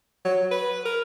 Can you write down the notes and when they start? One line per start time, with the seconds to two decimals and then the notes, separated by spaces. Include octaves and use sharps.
0.25 F#3
0.51 B4
0.85 A#4